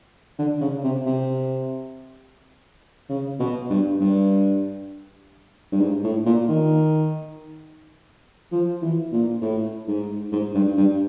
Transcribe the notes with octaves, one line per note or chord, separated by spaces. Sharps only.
D3
C#3
C3
C3
C#3
B2
G2
G2
G2
G#2
A2
A#2
D#3
F3
E3
A#2
A2
G#2
G#2
G2
G2